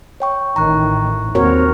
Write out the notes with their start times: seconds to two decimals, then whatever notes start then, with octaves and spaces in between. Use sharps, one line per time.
0.20 C#5 G5 C#6
0.56 A1 A2 D#3 A#5 C#6 F#6
1.35 D#2 C4 F#4 A#4 C#5